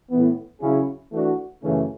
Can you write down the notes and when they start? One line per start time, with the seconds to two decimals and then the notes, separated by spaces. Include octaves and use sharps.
0.10 A2 E3 B3
0.60 C#3 F#3 C#4 E4 G#4
1.11 E3 A3 D4 F#4
1.62 F#2 C#3 E3 A3 C#4